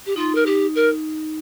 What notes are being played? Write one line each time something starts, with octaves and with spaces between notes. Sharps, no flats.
G4
D#4 F4
A#4
G4
A#4